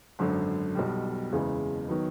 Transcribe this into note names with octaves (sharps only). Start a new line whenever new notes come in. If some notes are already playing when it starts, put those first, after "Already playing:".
G#1 F#2 D3
B1 B2 G3
F#1 E2 C#3 E3 G#3
D#3 F#3 B3